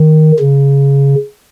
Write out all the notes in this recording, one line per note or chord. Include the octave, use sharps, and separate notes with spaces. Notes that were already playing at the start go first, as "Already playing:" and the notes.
Already playing: D#3
C#3